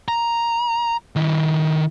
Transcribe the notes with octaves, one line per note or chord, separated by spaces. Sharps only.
A#5
D#3 E4